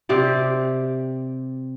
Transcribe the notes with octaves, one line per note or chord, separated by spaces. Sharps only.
C3 C4 G4 D5